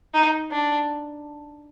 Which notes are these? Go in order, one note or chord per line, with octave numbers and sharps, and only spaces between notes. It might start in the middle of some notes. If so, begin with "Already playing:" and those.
D#4
D4